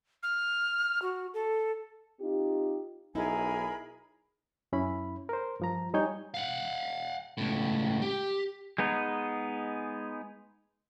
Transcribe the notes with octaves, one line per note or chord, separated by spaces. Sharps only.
F6
F#4
A4
C4 D#4 F4 G4
B1 D#4 E4 G#4 A#4 G#5 B5
F#2 C#4 E4 B5
A#4 C5
G2 F3 A#5
G3 D#4 C#5 G#5 G6
F5 F#5
C#2 A2
G4
G#3 B3 D#4